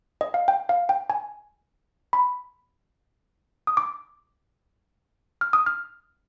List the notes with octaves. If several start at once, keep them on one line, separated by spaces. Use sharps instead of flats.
D#5
F5
G5
F5
G5
G#5
B5
D#6
D6
F6
D#6
F6